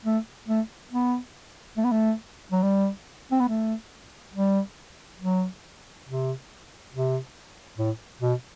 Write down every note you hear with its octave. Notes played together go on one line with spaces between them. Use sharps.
A3
A3
B3
A3
B3
A3
F#3
G3
C4
B3
A3
G3
F#3
C3
C3
A2
B2